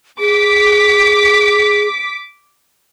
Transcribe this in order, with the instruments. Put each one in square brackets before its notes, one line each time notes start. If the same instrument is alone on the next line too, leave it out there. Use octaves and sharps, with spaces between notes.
[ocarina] G#4 [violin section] D6 B6